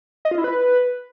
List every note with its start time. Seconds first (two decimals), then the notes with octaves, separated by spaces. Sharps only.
0.25 D#5
0.31 F4
0.38 E4
0.44 B4